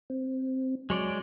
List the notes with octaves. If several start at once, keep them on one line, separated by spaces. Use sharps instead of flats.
C4
F#3 G#3 C#5 D5